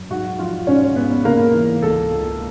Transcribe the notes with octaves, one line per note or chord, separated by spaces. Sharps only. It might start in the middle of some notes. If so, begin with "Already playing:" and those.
Already playing: F#2
G#2 F#4 F#5
F3 F4 F5
G#2 C#4 C#5
G#2 B3 B4
C#3 A#3 A#4
E3
C#2 A4
C#2